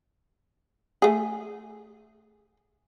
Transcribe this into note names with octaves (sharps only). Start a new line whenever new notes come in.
A3 G#4